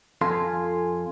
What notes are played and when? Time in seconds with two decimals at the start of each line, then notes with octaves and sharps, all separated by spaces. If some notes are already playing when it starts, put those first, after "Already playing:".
0.21 F2 F4 A4 G#5 C6